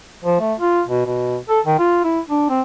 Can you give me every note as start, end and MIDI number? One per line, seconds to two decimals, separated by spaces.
0.25 0.40 53
0.41 0.54 57
0.60 0.82 65
0.88 1.06 47
1.06 1.37 47
1.49 1.60 69
1.66 1.79 51
1.79 2.02 65
2.04 2.20 64
2.30 2.47 62
2.49 2.62 60